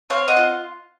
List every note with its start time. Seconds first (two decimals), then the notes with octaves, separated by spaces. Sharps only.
0.10 C4 C#5 F5
0.28 D#5 F#5
0.37 F4